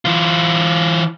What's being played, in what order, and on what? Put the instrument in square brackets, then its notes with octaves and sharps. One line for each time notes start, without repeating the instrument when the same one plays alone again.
[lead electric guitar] E3 F4